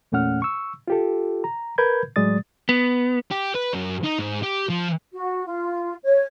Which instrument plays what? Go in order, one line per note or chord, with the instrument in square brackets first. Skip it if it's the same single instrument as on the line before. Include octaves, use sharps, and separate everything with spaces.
[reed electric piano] E2 A#2 A3 C#4 F#5 F6
C#6 E6
F4 G4 A4
A#5
A#4 B4 B5 G6 G#6
A2 F#3 G#3 D5 D#6 A6
[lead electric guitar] B3
[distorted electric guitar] G4
B4
F#2
D#4
G#2
G4
F3
[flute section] F#4
F4
C#5